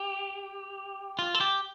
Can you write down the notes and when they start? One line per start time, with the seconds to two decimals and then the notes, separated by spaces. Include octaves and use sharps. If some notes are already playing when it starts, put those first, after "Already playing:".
Already playing: G4
1.19 F4
1.34 A4
1.41 G4